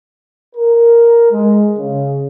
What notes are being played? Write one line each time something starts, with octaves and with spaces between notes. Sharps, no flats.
A#4
G#3
C#3